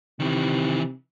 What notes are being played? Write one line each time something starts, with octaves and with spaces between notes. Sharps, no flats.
C3 D#3 E3